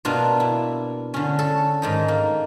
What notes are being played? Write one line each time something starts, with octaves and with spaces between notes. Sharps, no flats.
B2 A#3 D4 F4
E4
D3 C#4
A4
G#2 D#3 D#4
A#3